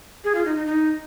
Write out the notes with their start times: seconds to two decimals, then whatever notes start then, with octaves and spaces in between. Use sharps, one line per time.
0.24 G#4
0.35 F4
0.45 D#4
0.56 D#4
0.66 D#4